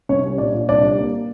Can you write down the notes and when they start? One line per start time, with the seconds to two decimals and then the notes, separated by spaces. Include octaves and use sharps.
0.09 C2 C#4 C#5
0.24 G3
0.38 A#2 D4 D5
0.54 A#2
0.68 C2 D4 D5
0.83 G3
0.98 A#3